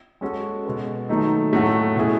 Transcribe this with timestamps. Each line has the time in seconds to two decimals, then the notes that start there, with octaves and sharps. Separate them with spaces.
0.21 G#3 C#4 F#4 A4
0.65 B2 G#3 B3
1.09 D#3 F#3 A3 D#4 A4
1.52 A2 F#3 A3 C#4 F#4
1.96 B2 A3 E4 G#4